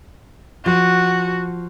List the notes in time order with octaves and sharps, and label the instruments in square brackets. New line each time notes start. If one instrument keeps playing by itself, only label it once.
[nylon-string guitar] F3 [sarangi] F#4